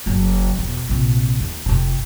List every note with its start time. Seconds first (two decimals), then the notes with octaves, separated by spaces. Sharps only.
0.06 F#1 F#3
0.59 E1
0.89 A#1 C3
1.40 D#2
1.66 F1 C3